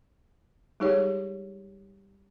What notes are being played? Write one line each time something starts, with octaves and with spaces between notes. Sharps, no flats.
G3 G#3 D#4 G4 G#4 C#5